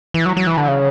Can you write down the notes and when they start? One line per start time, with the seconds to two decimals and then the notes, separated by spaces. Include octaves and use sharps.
0.14 E3
0.26 F#3
0.37 F#3
0.47 E3
0.57 D3
0.68 C#3